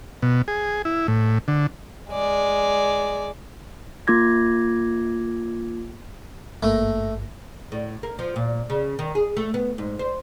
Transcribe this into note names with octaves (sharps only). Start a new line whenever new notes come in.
B2
G#4
E4
A2
D3
G#3 D5
A#3 F4 D6 G#6 A#6
G#1 G2 A3 A#3
A2
A#3
F3
A#2
C#3
D#3
G#4
A3
B3
G#2
C5